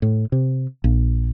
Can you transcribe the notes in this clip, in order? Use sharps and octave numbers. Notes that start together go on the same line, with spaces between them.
A2
C3
A#1